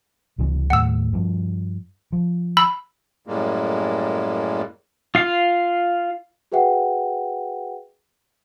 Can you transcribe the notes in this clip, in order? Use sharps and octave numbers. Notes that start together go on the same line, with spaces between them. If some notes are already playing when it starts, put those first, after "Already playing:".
C#2 C3 E3
D#2 A2 F#5 E6
G2 F3
F3
B5 E6
F#2 A2 G3 G#3 A#3
F4 F5
F#4 G#4 B4 E5 F#5 G5